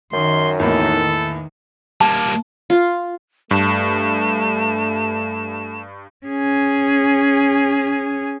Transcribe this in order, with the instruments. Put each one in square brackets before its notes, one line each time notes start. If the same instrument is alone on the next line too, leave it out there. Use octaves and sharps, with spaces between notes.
[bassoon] F#2 [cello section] D#3 [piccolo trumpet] C6
[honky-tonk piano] E2 A2 A#3 [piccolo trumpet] A4
[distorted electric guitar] G3 A#3 [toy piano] A5
[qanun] F4
[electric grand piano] G2 [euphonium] A3 [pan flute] A5
[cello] C#4 G#4